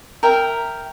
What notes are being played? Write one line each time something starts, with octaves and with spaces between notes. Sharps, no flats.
A#4 E5 G5